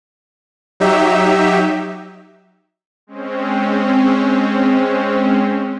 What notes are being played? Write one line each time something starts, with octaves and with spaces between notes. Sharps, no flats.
F#3 D#4 G4 E5
G#3 C4 C#4